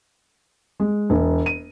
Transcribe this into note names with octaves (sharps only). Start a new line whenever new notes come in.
G#3
E1
D#7